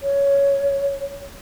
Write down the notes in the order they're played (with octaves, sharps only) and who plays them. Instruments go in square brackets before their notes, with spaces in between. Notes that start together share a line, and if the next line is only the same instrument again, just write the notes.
[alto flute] C#5